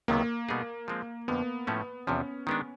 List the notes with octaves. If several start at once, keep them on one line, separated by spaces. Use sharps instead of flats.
C#2 C3 D#3 F#3 A#3 B3
B2 G3 B3 D#4 G#4
F3 G#3 C4
F2 D3 F3 B3
A2 F3 A3 C#4
E2 C3 F3 C#4
D#3 G#3 B3 D4